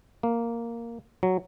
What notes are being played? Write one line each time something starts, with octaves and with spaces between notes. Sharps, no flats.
A#3
F#3